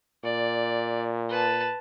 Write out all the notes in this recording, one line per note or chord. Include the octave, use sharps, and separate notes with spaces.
A#2 D5
B4 A5